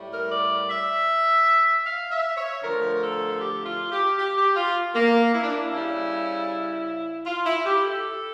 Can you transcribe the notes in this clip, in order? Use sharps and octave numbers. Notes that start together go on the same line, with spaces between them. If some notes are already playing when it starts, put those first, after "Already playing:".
Already playing: A2 G3
A#4
D5
E5
F5
E5
C#5
D3 F3 A3 A#4
A4
G4
E4
F4
G4
G4
G4
F4
A#3
E4
D4
E4
C#3 G3
F4
E4
G4
A4